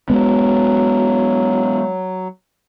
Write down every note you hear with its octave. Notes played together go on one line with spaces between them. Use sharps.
F#3 G#3 B3